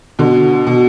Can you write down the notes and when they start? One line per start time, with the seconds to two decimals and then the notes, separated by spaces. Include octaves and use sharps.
0.19 B2 D3
0.67 B2